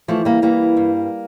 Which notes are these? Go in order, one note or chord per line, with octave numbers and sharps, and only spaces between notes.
E3 F3 A3
G3 A#3
E3 G3 A#3
G2